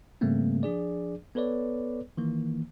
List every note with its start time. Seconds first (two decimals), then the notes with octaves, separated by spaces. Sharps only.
0.21 G#2 C#3 G3 A3 A#3 C4
0.63 F3 D4 G#4 D5
1.35 B3 A4 B4 C#5 D5
2.17 D#3 E3 A#3